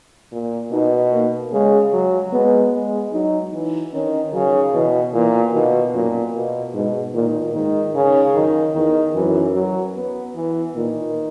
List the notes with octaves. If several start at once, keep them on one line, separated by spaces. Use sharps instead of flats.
A#2
B2 D#4
A#3
C#3 G#3
F#3
G#3 B3
G#3
F#3 D#4
E3
D#3 C#4
C#3 F#3
B2 E3
A#2 E3
B2 D#3
F#2 A#2
B2
G#2 B2
A#2 D#3
G#2 D#3
C#3
F#2 D#3
E2 D#3
F#2 E3
F#3
B3
E3
A#2 D#3